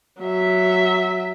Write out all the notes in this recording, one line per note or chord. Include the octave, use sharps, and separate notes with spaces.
F#3 E5